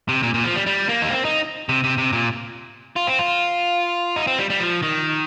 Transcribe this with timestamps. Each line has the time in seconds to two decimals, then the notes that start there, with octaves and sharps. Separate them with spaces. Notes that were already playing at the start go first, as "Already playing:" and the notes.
0.09 C3
0.23 A#2
0.34 A#2
0.44 F3
0.56 G3
0.66 G3
0.89 A#3
1.02 D#4
1.11 C4
1.25 D#4
1.69 C3
1.84 C3
1.98 C3
2.13 A#2
2.96 F4
3.07 C4
3.19 F4
4.16 D#4
4.27 C4
4.38 G3
4.50 G3
4.60 F3
4.82 D#3